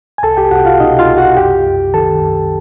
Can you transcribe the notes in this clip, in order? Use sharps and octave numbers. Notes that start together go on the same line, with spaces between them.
G#5
C2 A4 A5
G4 G5
C2 F#4 F#5
F4 F5
B2 D#4 D#5
F4 F5
C2
F#4 F#5
F#2 G4 G5
F#2
D#3 A4 A5
F#2